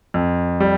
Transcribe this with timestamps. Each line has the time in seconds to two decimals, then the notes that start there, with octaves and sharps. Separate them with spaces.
0.14 F2
0.60 G3